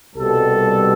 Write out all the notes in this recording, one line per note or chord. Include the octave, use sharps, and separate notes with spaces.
C2 B2 G3 A4